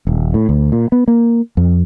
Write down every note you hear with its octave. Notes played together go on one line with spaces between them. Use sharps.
D#1
A2
D2
A#2
B3
A#3
F2